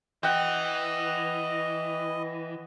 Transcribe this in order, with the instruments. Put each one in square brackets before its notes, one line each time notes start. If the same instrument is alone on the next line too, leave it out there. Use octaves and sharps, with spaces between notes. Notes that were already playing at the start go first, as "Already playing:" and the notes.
[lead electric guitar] E3 [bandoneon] D#5 [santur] F#5 G5